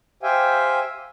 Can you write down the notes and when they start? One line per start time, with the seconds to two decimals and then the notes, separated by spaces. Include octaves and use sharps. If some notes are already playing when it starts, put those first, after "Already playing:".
0.23 G4 C5 E5 F5 G5 G#5